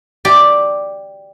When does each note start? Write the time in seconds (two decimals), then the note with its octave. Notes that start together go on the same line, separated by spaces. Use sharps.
0.25 G4 D5